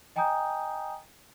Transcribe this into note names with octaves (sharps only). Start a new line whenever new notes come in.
D#5 G5 G#5 A#5 D#6 G6